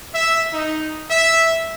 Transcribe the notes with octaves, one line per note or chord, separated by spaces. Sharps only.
E5
D#4
E5